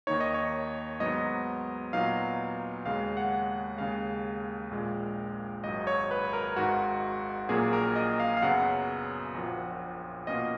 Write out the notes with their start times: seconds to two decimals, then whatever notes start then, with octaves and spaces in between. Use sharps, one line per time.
0.07 D#2 D#3 A#3 D#4 C#5
0.20 D#5
0.34 C#5
1.00 G#2 F#3 B3 D#4 D#5
1.93 A#2 F#3 B3 D#4 F5
2.85 D#2 C#3 G#3 F5
3.17 F#5
3.78 D#2 C#3 G#3 F5
4.71 A#1 A#2 G#3
5.63 G#1 G#2 F#3 D#5
5.87 C#5
6.11 B4
6.33 A#4
6.56 G#1 G#2 D#3 F#4
7.49 A#1 A#2 F#3 A#3 C#4 G#4
7.73 A#4
7.96 D#5
8.20 F5
8.37 F5
8.42 F#2 C#3 F#3 B3 F#5
9.34 A#1 A#2 F3
10.27 B2 A#3 C#4 F4 D#5